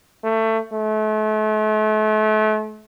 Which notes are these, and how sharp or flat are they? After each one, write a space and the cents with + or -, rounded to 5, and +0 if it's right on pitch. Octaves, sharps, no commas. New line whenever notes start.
A3 +20
A3 -35